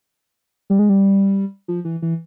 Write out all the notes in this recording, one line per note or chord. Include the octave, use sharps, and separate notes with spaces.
G3
G#3
G3
F3
E3
E3